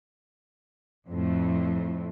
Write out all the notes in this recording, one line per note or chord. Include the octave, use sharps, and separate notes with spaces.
F2 A2